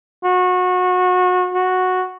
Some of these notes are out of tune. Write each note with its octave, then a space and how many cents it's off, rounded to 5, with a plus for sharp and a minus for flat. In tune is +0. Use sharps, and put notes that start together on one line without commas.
F#4 -25
F#4 -5